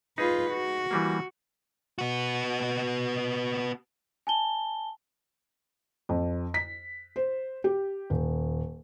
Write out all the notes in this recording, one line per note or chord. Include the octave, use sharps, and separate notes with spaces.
D#4 F4 G#4 B4
F#4
E3 G3 A#3
B3 F#4
G#5 A5 G7
F2
B6
C5
G4
D#1